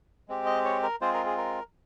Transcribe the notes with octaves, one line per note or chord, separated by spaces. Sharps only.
G#3 C4 G4
D#5
C#5
A#4
G#3 C4 F4 G#4 C5
A#4
G#4
A#4